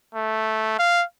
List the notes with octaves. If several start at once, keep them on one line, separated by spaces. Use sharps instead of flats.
A3
F5